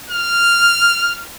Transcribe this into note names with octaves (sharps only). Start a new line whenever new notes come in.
F6